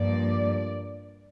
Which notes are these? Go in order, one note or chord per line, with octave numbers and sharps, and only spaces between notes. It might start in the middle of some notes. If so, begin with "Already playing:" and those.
Already playing: G2 F3 A#3 D5